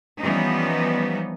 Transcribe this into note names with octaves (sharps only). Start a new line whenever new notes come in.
E3 F3 G3 B3 C#4 D#4